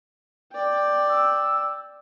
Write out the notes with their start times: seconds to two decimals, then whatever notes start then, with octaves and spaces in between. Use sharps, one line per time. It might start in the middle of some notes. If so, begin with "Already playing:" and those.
0.52 D5 G5
1.09 E6